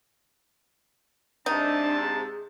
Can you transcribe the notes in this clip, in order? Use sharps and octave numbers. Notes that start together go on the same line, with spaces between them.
G#2 C3 D4 D#4 A5
G#4